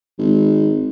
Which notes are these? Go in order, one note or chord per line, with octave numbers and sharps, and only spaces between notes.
G#1